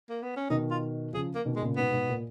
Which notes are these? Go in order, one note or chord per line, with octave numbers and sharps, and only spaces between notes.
A#3
B3
C#4
B2 D#3 D#4
F4
C#3 F3 G#4
A#3
B2 D#3
G#3
A#2 C#3
G#2 B2 B3
G#2 B2
A#2